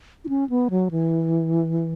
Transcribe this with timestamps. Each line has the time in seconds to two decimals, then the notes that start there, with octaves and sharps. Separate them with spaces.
0.25 E4
0.29 C#4
0.50 B3
0.70 F#3
0.91 E3